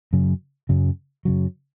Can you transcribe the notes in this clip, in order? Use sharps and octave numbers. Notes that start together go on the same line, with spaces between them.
F#2 C#3 F#3
F#2 C#3 F#3
F#2 C#3 F#3